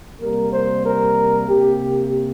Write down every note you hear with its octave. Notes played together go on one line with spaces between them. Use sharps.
C3 G3 A#3 A#4
C5
A#4
C3 A#3 G4